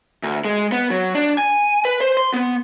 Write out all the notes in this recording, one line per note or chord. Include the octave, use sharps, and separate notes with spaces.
D2
G#3
B3
F#3
D4
G#5
B4
C5
C6
B3